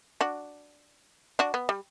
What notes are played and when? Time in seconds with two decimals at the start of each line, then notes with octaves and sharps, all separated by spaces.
0.21 D4 F#4
1.39 D4 F#4
1.54 B3
1.69 G3